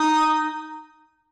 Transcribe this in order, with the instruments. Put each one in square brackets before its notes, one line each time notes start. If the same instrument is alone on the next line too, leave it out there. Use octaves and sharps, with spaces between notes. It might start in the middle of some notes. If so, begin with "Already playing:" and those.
Already playing: [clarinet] D#4 [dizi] D#6